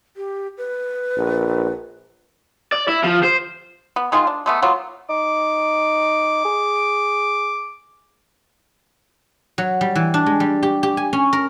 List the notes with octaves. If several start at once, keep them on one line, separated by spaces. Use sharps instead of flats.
G4
B4
A#1
D5
E4
F3
C5
B3
D#3 G#3 D#4 F4
D4
G#3 A3 B3
F#3 A#3 B3 F4
D#4 D6
G#4
F#3
G3
E3
D4
G#3
G3
G4
G4
G#5
C#4
A#4